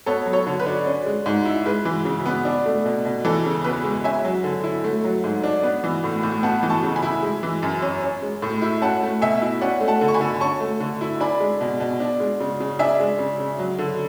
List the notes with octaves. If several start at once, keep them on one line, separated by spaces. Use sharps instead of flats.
B3 A4 C#5
F#3
A4 C#5
D3
B4
D4
C#4
G#3
G#2
E4
G#3 B4
E3
C#3
B3
D4
A3
B2
B2
E3 A4
C#3
E2 B4
G#3
C#4 E5 G#5
F#3
D3
E4
A3
F#3
G#2
D4
B3
E3
A2
A2
B3 F#5 A5
E3
A5 C#6
C#3
G#5 B5
E4
G#3
E3
F#2
C#4
C#4
G#3
A2
E4
C#4 F#5 A5
A3
B2 E5 G#5
E4
C#4 D5 F#5
A3
F#5 A5
D3
C#6
G#5 B5
D3
C#4 A5 C#6
A3
D3
E4
D4 G#5 B5
G#3
B2
B2
D4
G#3
C#3
C#3
D4 E5 G#5
G#3
C#3
C#3
F#3
D3